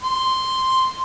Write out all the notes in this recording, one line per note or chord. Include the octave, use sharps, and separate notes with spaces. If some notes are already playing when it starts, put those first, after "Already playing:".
C6